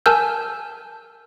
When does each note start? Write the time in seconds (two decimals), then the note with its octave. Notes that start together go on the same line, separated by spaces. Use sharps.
0.06 A#4 G#5 A5 E6 F6 G6